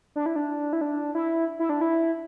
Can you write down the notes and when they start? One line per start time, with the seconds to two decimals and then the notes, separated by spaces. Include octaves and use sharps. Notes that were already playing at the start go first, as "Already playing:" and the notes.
0.16 D4
0.26 E4
0.36 D4
0.73 E4
0.81 D4
1.15 E4
1.59 E4
1.69 D4
1.81 E4